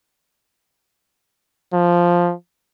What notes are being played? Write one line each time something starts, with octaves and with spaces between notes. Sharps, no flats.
F3